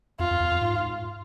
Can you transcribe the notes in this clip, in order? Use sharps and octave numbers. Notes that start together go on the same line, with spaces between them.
F2 F4
F2
E2
F2
G#2